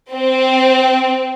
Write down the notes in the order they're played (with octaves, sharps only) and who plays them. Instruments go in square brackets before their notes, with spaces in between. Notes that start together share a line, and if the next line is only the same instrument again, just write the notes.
[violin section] C4